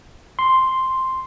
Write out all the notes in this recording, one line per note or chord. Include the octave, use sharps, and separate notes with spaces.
C6